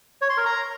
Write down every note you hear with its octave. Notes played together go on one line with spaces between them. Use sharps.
C#5
C6
A#4
A#5